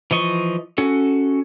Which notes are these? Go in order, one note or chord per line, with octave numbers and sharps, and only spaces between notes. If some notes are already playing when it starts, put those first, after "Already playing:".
E3 F3 D#5 C#6
C#4 F#4 A4